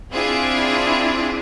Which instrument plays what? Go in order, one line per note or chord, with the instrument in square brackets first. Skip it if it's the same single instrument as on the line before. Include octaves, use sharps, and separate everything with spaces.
[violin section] C4 F4 G#4 [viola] D4 E4